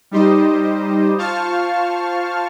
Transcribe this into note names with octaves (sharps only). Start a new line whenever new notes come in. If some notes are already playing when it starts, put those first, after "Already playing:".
G3 D#4 G4 C5 D#5
F4 C5 F5 A5 C#6 F6